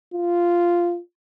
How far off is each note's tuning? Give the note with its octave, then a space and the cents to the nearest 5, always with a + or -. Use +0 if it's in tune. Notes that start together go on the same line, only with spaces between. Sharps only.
F4 -5